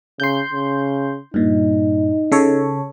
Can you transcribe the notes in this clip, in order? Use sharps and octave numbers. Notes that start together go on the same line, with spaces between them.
C#3 C6 G6
C#3
G2 A#2 D#4
C#3 A4 C#5